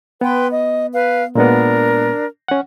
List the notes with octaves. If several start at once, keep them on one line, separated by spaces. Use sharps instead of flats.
B3 B4 G5 C6
D#5
B4 F5
A#2 G#3 B3 D4 A#4
C#4 F#5